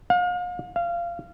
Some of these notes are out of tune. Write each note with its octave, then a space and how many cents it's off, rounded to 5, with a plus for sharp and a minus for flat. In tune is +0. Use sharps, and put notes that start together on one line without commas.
F5 +40
F5 -20